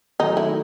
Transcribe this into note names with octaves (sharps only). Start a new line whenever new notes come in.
D#3 F#3 A3 D#4
E4